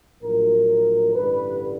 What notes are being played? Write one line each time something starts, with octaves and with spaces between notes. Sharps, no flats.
A#1 A2 F#3 A#4
A1 G2 D3 G3 B4